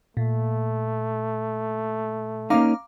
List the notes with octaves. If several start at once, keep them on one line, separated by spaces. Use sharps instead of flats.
A#2 A3
A#3 C#4 D#4 F5 A#5 D6